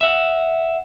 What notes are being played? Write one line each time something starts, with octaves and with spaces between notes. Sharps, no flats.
E5 F#5